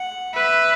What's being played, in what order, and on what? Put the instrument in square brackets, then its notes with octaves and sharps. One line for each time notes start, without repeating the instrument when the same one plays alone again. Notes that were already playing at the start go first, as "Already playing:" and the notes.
Already playing: [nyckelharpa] F#5
[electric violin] B4 [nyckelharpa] E5